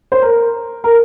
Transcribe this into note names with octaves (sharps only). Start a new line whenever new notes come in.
C5
A#4
A#4